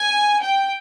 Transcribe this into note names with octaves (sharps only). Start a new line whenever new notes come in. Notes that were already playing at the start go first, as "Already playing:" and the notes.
Already playing: G#5
G5